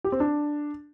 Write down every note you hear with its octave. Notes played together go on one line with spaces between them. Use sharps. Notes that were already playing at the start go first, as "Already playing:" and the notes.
G4
C4
D4